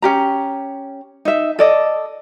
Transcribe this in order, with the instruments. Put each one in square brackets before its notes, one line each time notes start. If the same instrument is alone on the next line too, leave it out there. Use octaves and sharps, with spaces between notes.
[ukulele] C#4 G4 A#5
D#4 E5
A4 D5 D#5